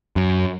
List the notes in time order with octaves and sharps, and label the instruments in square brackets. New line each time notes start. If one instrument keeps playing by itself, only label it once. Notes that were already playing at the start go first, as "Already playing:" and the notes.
[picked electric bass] F#2